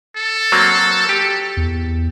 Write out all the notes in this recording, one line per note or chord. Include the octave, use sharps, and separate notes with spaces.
A4
F#3 A#3 C4
G4
E2